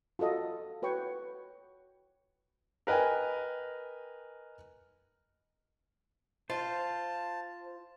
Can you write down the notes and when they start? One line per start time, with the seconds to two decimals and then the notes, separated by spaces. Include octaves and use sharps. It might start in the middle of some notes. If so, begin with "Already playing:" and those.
0.19 F4 F#4 A4 D#5
0.82 F#4 B4 C#5 G5 C#6
2.87 A#4 B4 D#5 G5 G#5
6.50 F4 C5 A5